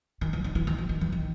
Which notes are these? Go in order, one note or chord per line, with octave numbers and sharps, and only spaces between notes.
D#3
E3
D#3
E3
D#3
E3
D#3
E3
D#3